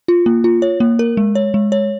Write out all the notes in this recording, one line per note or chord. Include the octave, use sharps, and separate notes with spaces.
F4
A#3
F4
C#5
A#3
A#4
G#3
C#5
G#3
C#5